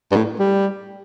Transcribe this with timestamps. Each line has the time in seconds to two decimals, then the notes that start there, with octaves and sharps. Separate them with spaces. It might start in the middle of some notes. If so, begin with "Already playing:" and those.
0.12 G2
0.16 A2
0.39 G3